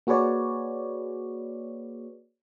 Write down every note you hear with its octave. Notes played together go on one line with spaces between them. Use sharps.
A#3 F#4 G#4 B4 C#5 D5